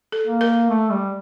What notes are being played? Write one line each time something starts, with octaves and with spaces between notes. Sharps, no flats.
A4
A#3
A#4
A3
G3